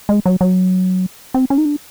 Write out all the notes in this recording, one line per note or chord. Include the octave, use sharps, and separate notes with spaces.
G#3
F#3
F#3
C4
C#4
D#4
D4